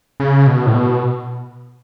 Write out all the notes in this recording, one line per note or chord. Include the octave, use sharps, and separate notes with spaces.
C#3
B2
A2
B2